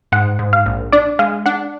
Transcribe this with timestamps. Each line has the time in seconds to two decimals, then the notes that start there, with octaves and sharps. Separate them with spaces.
0.12 G#2 F#5
0.39 G#2
0.53 F5
0.66 A#1
0.92 D4 D5
1.19 G#3 F5
1.46 D4 F#5